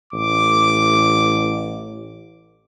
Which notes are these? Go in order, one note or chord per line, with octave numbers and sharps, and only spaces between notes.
A1 D6